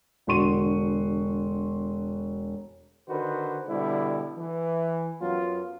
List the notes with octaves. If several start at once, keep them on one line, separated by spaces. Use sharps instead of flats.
E1 D3 F#4 C6 C#6 D#7
D3 D#3 F#4 B4 C5
B2 D3 G3 E4
E3
F#2 F#3 B3 F4